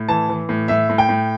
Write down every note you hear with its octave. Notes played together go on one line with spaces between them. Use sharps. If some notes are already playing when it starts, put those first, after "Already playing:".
Already playing: A2
E3 A5
E3
A2
A2 E5
A2
G5
A2